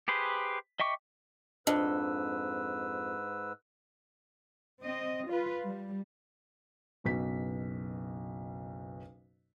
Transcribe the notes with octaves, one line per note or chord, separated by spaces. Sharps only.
G4 G#4 B4 C5
D#5 E5 G5 C#6 D6
F2 G#2 D4 B4 D#5 E6
C4 D#5
F4 B4
G3
F#1 B1 B2 B6